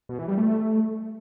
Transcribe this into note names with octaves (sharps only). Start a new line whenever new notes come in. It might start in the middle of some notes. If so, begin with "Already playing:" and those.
B2
E3
G3
A3